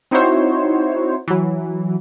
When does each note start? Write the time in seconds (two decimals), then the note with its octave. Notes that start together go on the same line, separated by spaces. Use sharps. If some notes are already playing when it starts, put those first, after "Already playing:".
0.11 C4 D#4 E4 F#4 C5 C#5
1.28 E3 F#3